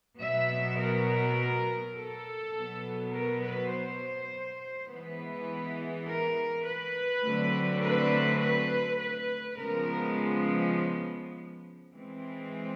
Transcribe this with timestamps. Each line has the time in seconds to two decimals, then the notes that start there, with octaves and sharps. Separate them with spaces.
0.19 B2 F#3 B3 E5
0.77 A#4
1.95 A4
2.54 B2 F#3 B3
3.13 A#4
3.42 B4
3.71 C5
4.89 E3 G#3 B3 B4
6.06 A#4
6.65 B4
7.23 D3 F#3 A3 C4
7.82 B4
8.41 B4
9.00 B4
9.58 C#3 F3 G#3 B3 A#4
11.94 E3 G#3 C4